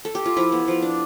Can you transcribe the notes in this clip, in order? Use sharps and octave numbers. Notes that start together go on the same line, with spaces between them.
A4
G4
F4
F3 E4
B3
F3
D4